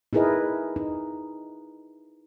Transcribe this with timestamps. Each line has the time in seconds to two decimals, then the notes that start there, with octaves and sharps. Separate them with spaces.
0.13 D#4 E4 G#4 A#4 B4 D#5
0.76 D#4